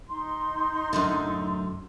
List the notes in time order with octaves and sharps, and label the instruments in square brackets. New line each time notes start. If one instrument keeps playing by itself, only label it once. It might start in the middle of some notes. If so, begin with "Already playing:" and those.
[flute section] D#4 C6
[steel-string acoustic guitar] F#2 A2 D3